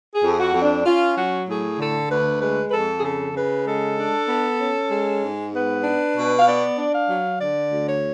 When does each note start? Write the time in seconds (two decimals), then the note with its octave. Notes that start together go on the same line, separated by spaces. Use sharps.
0.14 G#4
0.22 F2
0.32 G#4
0.38 F#4
0.53 F2
0.61 D4
0.84 C#4 F4
1.15 F#3 F#4
1.46 A2 G#4
1.77 D3 A4
2.08 D2 B4
2.40 G#3 B4
2.68 B4
2.71 F2 A4
2.98 G#4
3.02 C#3 A4
3.34 C#3 B4
3.65 G#3 A4
3.96 D4
4.28 B3
4.58 C#4
4.90 G#3
5.22 G#2
5.53 B3 B4
5.83 D4
6.15 B2
6.39 F5
6.46 B3 D5
6.77 D4
6.93 F5
7.09 F#3
7.40 D3 D5
7.71 D2
7.87 C#5